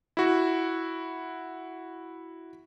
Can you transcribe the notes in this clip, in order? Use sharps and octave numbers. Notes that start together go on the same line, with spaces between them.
E4 F#4